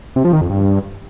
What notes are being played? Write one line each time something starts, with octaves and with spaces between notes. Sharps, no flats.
C3
F3
D#3
F2
G2